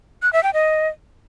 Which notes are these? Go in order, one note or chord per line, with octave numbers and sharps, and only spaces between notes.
F#6
E5
G5
D#5